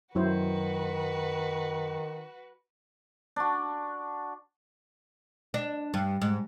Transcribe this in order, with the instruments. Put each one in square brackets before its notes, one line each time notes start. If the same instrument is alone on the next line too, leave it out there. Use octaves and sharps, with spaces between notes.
[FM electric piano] F#2 [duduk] D#3 [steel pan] F#3 E4 C5 [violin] F#4 B4
[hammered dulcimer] D4 F#4
[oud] D4
G2
G#2